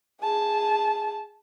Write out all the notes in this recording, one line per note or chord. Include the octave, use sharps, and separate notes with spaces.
G#4 A5